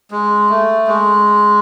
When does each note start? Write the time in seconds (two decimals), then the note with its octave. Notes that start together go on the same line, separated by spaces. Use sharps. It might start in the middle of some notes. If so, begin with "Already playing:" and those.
0.11 G#3
0.50 A3
0.87 G#3